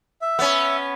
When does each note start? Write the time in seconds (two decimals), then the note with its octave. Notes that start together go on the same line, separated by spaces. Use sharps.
0.22 E5
0.39 B3 C#4